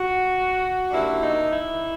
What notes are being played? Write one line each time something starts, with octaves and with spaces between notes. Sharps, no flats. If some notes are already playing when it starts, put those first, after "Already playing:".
Already playing: F#4
F#2 D3 G3 A#3 D4 E4
D#4
E4